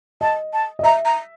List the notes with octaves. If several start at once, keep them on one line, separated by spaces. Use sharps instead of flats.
D#5 A5
A5
D#5
E5 A#5
A#5